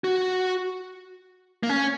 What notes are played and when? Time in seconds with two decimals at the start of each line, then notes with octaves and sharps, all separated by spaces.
0.04 F#4
1.63 A#3
1.69 C#4